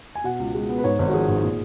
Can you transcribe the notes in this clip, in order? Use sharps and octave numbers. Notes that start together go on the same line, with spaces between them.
G#5
B2 F#5
C#2
G#3
B3
B4
G#2 C#5
G#1
F#4
F3 G#4
G#1
A#2